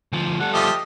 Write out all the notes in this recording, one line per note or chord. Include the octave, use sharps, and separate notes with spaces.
D2 F3
G3 A4 F#5
F3 A3 G4 D#5